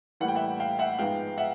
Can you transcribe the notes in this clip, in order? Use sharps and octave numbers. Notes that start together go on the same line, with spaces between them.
A2 E3 G3 A#3 F#5
G5
E5 F#5
F5 G5
E5 F#5
G#2 F3 G#3 B3 F5 G5
E5 F#5